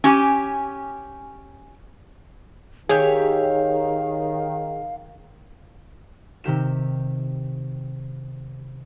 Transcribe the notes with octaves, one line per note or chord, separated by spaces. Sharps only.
C#4 G4 G#5
D#3 G4 G#4 C#5 E5 F5
C3 D#3 G4 E7